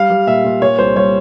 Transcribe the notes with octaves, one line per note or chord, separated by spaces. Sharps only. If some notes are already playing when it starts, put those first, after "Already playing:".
Already playing: G3 F5
G3
A#2 E5
A#2
A#2 C#5
C2 C5
G3 C#5